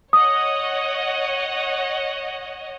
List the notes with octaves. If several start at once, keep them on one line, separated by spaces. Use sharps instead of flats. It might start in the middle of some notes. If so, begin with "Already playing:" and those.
C#5 D#5 F#5 D#6